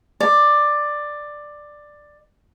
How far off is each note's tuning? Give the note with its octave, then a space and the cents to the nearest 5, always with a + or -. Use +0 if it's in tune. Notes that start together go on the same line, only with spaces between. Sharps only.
D5 +10